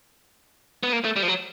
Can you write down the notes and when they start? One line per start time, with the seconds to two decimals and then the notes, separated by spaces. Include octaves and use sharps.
0.83 B3
0.93 A#3
1.04 A3
1.16 G3
1.23 F3
1.28 F#3